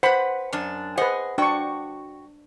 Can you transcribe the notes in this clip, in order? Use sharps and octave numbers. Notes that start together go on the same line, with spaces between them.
B4 C5 F#5 B5
F#2 D4
G#4 B4 C5 D#5 F#5
D4 F#4 G5 C#6